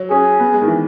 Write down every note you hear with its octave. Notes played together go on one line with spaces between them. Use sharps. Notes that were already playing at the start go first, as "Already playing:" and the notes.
Already playing: F#3
C#4 G#4
B3
G#3
D#3
E3